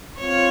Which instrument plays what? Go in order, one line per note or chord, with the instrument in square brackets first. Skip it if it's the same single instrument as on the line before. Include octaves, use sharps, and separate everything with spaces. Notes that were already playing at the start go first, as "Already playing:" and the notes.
[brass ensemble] C4 F4 [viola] C#5